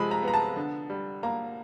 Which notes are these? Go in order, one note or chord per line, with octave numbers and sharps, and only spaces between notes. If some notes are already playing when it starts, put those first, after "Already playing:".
Already playing: C3 F3 G#3 B5
A#5
B3 A#5
A5
D3
G3
A#3 A#5